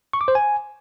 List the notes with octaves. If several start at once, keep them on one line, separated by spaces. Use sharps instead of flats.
C#6
D6
C5
G#5